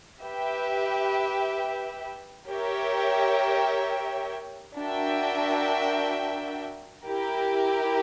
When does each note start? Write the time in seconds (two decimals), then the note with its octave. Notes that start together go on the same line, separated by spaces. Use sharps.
0.21 G4 B4 E5 G5
2.48 G4 A#4 C#5 E5 G5
4.76 D4 F#4 A#4 E5 G5
7.04 E4 G4 A#4